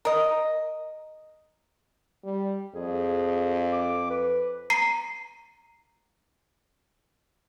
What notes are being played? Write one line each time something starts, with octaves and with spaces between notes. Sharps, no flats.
A#4 D#5
G3
F2 G#4
D6
B4
A#5 C7